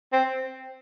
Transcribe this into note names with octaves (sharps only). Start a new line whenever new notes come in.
C4